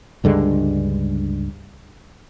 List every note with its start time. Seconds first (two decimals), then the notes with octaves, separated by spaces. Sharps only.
0.24 C#2 G2 D3 G#3